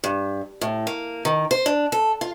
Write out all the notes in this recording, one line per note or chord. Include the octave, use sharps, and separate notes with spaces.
G2
A2
A#3
D#3
C5
D4
A4
F4